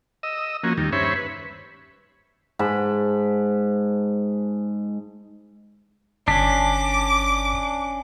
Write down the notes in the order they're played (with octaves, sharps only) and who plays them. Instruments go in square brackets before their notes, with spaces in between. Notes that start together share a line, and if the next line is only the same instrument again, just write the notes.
[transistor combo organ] D#5 E6
F3 A#3 C#4 F#4
D#2 D#3 G3
G2 C#4 C5 C#5 E5 B5
B4
[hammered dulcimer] G#2 A5 B5
[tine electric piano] G1 B6 [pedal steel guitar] C#4 D4 [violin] D6